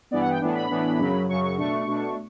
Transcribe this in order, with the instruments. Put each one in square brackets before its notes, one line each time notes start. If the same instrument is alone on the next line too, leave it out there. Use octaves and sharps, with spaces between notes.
[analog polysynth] G2 E3 B3 D5
F#5
G5
A2 E3 B3 D4
B5
A2 E3 B3 D4
F#2 C#3 F#3
F#2 C#3 F#3 C#6
C#6
B2 A3 D4 C#6
B2 A3 D4